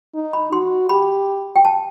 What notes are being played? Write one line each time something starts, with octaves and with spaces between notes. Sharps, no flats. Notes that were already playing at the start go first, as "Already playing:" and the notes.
D#4
B5
F#4 C6
G4 B5
G5
A5